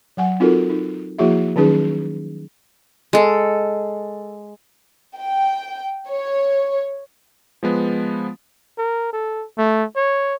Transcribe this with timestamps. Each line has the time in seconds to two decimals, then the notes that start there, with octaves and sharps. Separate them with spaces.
0.17 F#3 F#5 G#5
0.40 C4 D#4 F4 F#4 A4 A#4
0.70 D#4
1.18 F3 A#3 E4 F#4 G#4 E5
1.56 D#3 F#3 C#4 D#4 G#4 B4
3.13 G#3 A4
5.18 G5
6.09 C#5
7.63 F3 G#3 B3
8.78 A#4
9.13 A4
9.58 A3
9.96 C#5